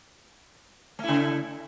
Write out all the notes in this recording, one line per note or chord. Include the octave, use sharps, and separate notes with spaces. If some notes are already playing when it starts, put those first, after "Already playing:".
C#3 A3 E4